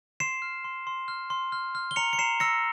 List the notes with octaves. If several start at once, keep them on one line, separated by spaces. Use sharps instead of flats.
C6 C7 E7
F6
C6
C6
F6
C6
F6
F6
G7
A#5 C#7 F7
C#7
A#5 C7 E7
E6 A#6 C#7